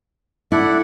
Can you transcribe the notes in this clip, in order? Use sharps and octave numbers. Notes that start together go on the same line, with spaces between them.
E4 A4 D5 F#5